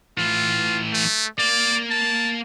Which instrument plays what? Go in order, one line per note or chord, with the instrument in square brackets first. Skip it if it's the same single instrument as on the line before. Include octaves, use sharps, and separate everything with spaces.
[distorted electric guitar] A2 E3 [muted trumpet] F4
[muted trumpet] A3
[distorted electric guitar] A#3 [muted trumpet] D5
[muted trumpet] A5